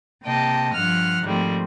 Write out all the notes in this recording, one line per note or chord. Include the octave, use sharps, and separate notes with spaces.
C3 A#3 D#5 G5 A5
G2 F3 F#5 F6
G#2 D#3 F3 G3 A3 C4